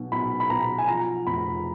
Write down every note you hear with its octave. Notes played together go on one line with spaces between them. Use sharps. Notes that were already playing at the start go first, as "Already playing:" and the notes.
Already playing: B1 B2
B1 B5
B5
B2 A#5
G#5
F3 A#5
F1 B5